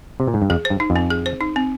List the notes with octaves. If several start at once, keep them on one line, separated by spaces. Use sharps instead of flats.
C3
A#2
G#2
G2
F2 G#4
C5
G2
D#4
F2
C4
G#4
C5
D#4
C4